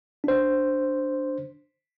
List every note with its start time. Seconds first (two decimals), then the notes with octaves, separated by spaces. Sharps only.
0.24 D4 C5